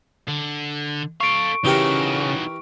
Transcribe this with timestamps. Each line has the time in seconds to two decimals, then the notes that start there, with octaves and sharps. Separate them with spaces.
0.28 D3
1.21 A4 F5 C#6 D7
1.65 C#3 E3 D#4 F#4 G4 A#4